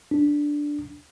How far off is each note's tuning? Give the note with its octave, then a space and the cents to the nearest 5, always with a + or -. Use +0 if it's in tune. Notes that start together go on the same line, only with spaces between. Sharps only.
D4 -5